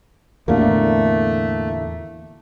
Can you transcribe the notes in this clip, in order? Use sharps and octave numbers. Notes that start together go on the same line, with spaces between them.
E2 A2 D3 A3 A#3